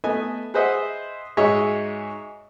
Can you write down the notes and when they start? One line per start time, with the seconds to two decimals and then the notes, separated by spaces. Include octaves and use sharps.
0.04 A3 B3 D#5 G#5
0.54 G#4 B4 C5 D#5 E5 F#5
1.37 G#2 G#3 F#4 C#5 D#5 E5